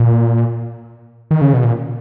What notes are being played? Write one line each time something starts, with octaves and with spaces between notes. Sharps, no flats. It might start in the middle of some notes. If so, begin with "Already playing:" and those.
Already playing: A#2
D#3
C#3
B2
A#2